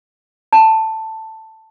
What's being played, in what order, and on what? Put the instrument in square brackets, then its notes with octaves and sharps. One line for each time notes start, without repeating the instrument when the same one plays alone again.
[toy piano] A5